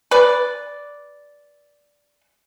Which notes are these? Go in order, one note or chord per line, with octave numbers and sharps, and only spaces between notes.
B4 D5